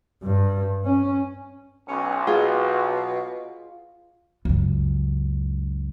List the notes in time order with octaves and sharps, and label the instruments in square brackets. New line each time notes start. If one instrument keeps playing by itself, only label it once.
[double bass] G2
C#4
[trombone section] B1 [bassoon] C#4
[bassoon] B2 [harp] F4 G#4
[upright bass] C#2 F#2